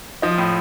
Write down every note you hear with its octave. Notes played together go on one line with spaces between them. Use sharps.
F3 D#5
A2